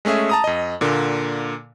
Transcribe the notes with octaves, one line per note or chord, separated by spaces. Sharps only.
G#3 A3 C#4 G#4 E5
A5 A#5 D#6
F2 D#5
A#2 D3 A#3